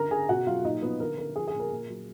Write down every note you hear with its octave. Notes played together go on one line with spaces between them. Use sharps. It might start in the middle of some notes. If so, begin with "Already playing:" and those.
Already playing: D3 A#4 A#5
D3 G#4 G#5
B2 F#4 F#5
F#3 F4 F5
A#2 D#4 D#5
F3 B3 B4
D3 A#4
D3 A#4
F3 G#4
G#4
A#2
A#4
A#2
F#3